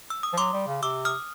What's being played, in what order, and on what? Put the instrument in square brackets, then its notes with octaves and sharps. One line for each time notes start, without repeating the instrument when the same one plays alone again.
[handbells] E6
D#6
[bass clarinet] F3
[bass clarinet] F#3 [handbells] C6 D6
[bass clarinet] G3
C#3
[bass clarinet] C3 [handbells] D6 E6
[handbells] D#6 F6